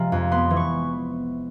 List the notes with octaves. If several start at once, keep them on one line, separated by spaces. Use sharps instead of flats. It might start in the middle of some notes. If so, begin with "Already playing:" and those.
Already playing: C3 F3 G#3 A#5
F2
B3 C6
E3
C#6